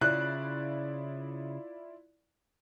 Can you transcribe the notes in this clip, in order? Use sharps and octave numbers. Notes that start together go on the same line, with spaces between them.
C#3 E4 F4 D5 F#6